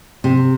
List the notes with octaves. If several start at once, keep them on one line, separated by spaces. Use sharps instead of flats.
C3